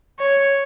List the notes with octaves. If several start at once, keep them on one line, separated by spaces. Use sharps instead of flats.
C#5